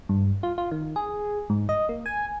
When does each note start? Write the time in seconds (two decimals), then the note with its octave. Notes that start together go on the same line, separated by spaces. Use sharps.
0.09 G2
0.43 F4
0.58 F4
0.71 D#3
0.96 G#4
1.50 G#2
1.69 D#5
1.89 A#3
2.06 G#5